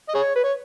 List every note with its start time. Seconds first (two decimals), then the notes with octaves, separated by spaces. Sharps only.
0.09 D#5
0.14 G#4 C#5
0.35 B4
0.44 C#5